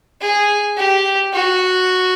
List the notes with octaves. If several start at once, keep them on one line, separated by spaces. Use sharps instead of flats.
G#4
G4
F#4